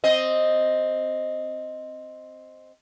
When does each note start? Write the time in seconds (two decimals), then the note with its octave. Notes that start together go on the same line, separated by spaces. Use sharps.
0.04 C4 D#5